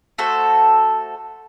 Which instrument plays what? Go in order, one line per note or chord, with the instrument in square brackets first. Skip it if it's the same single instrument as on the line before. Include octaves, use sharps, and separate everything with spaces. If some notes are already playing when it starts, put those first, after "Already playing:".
[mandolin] A3 F#4 A4 C5